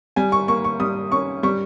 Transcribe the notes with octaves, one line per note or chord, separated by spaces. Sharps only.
G3 G#5
C#6
A#3 C#6
C#6
G3 D#6
C#4 C#6
G3 C#6